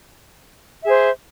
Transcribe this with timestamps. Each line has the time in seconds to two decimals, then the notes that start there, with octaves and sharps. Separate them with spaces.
0.82 E5
0.85 G#4
0.88 C5